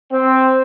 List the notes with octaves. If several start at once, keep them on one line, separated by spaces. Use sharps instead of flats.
C4